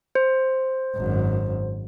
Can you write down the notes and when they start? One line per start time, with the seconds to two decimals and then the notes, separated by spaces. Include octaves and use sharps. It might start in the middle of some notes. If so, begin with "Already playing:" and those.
0.15 C5
0.95 G#1 F#2